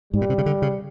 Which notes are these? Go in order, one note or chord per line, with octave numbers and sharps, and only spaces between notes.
G#2 G3
A#2
C3
C#3
D3
C#3